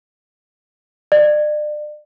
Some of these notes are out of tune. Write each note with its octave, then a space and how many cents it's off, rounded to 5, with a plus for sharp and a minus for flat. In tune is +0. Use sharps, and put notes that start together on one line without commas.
D5 +35